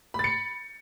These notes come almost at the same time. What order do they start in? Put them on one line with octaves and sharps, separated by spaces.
B5 A6 C#7